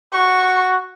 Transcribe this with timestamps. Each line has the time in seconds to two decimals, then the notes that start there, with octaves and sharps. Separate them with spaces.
0.14 F#4 C#6